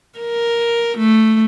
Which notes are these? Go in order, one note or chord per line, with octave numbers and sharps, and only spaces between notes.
A#4
A3